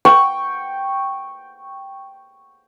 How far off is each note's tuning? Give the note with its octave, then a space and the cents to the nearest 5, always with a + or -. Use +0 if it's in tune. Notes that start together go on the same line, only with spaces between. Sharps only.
G5 +0 C#6 -5